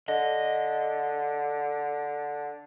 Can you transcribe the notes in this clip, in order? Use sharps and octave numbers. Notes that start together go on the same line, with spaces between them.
D3 D#5